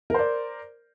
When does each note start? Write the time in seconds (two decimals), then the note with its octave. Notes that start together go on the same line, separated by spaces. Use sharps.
0.10 A#4
0.14 C5
0.19 D5